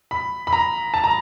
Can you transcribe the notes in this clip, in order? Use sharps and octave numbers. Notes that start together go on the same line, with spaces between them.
B5
B5
A#5
A5
A#5